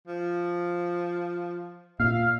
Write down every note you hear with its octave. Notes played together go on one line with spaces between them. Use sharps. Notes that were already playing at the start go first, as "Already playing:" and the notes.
F3
A#2 E5 F5